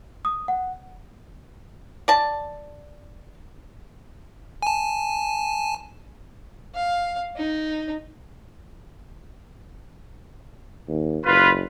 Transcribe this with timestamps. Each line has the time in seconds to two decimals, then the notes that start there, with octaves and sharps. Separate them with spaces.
0.25 D#6
0.48 F#5
2.08 D5 A5
4.62 G#5 A5
6.75 F5
7.36 D#4
10.88 D#2
11.26 F#1 F4 B4